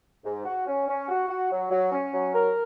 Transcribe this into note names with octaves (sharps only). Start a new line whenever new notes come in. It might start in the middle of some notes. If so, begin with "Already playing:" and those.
G#2
F#4
C#4
C#4
F#4
F#4
F#3
F#3
C#4
F#3
A#4